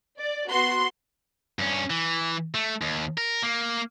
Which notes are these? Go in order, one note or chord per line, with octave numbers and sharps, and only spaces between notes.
D5
B3 F#4 C6
G2 C#4
E3
A3
D#2
A#4
A#3